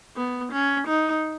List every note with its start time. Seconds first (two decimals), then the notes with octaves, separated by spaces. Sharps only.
0.16 B3
0.52 C#4
0.88 D#4